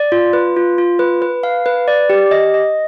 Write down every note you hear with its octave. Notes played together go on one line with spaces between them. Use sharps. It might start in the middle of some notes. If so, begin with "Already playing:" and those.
Already playing: D5
F4
B4
F4
F4
B4
B4
F5
B4
D5
G4
D#5
D#5